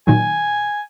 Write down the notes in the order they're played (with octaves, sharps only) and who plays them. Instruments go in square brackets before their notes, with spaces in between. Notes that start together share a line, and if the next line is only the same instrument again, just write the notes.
[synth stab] A#2 D#3 F#3 [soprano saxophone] G#5